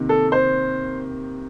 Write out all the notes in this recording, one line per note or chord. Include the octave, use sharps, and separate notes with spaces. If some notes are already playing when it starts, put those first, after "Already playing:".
Already playing: C3 D#3 A#3
A4
C5